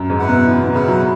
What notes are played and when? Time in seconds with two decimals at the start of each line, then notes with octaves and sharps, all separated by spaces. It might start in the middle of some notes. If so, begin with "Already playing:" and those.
Already playing: F#2
0.10 G#2
0.19 E4 B4 F#5
0.28 B2
0.47 E3 B3
0.60 B2
0.74 C#3 E4 B4 F#5
0.88 F#3